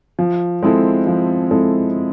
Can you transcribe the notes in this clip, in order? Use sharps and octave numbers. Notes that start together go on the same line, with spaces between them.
F3
G#3 C4 E4 A4
F3
G#3 C4 E4 A4